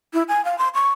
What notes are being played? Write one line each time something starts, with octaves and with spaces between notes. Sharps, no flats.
E4
G#5
F5
C6
C#6